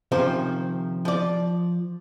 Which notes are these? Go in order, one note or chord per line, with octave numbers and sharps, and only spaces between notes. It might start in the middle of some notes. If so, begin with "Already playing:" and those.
C3 D#3 F3 C#4 C5
F3 D5